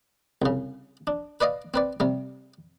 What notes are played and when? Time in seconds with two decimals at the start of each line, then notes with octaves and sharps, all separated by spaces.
0.42 C2 C#3
1.07 D4
1.41 B4 D5 D#5 F5
1.74 C4 B4 D5
2.00 C3 G3